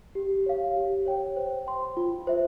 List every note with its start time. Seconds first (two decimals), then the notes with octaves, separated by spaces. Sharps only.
0.15 G4
0.46 C#5 F5
0.76 G4
1.06 C#5 G5
1.36 C5
1.67 G5 C6
1.97 F4
2.27 C5 E5